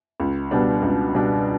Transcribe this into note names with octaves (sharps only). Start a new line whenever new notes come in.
C#2
B2 G3 B3 D4
C#2
B2 G3 B3 D4